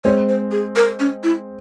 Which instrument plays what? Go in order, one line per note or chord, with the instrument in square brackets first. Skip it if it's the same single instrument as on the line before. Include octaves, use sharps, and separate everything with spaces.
[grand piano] G#3 C4 [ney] C#5
[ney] C5
G#4
A#4
C#4
E4